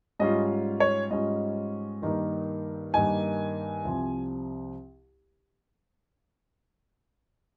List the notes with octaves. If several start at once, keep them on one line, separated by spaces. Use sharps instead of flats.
G#2 G3 C#4 F4 D#5
C#5
G#2 G3 C#4 F4 D#5
G2 D#3 A#3 D#4
G2 D#3 A#3 D#4 G#5
C2 C3 F3 C4